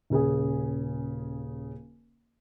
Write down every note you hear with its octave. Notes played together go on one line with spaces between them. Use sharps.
D#1 C#3 G#4